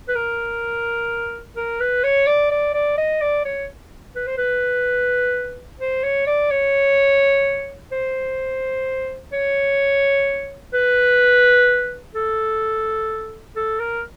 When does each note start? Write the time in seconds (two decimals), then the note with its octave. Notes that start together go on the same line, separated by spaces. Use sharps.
0.08 B4
0.15 A#4
1.57 A#4
1.80 B4
2.04 C#5
2.27 D5
2.51 D5
2.74 D5
2.98 D#5
3.21 D5
3.45 C#5
4.16 B4
4.27 C5
4.38 B4
5.80 C5
6.04 C#5
6.27 D5
6.51 C#5
7.92 C5
9.33 C#5
10.73 B4
12.15 A4
13.56 A4
13.80 A#4